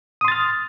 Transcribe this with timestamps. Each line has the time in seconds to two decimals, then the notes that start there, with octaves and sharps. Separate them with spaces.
0.21 D#6
0.25 C6
0.28 A6
0.32 F6